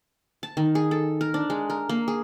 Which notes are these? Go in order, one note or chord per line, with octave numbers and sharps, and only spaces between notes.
A5
D#3
G#4
A4
A#4
D4
G#3
A#4
A#3
G#4